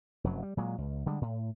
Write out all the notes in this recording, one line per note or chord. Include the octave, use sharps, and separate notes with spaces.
F1 F#2 F#3
G3
A#2 F#3 G#3
C#2
D3 G3 G#3
A2